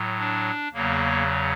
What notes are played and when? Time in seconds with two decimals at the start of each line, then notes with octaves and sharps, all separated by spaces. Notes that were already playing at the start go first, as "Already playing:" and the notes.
Already playing: A2 F#3
0.19 D4
0.73 E2 C#3 F#3 A#3